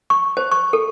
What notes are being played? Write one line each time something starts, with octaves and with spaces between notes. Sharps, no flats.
C#6
C5
C#6
A4